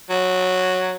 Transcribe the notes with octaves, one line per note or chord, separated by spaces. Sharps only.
F#3